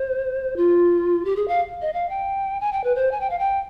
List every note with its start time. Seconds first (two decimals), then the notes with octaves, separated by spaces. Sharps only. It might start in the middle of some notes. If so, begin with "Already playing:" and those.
Already playing: C5
0.56 F4
1.25 G4
1.36 G#4
1.48 F5
1.81 D#5
1.93 F5
2.09 G5
2.60 G#5
2.72 G5
2.84 B4
2.95 C5
3.12 G#5
3.20 G5
3.30 F5
3.39 G5